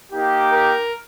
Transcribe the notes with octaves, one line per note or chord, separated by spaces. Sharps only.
A#3 D#4 G4
A#4